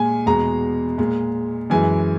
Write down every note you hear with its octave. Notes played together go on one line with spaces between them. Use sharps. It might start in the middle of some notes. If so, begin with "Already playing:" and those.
Already playing: A#2 G#3 G#5
E2 B2 G#3 A#5
A#2 G#3
F#2 E3 G#3 G#5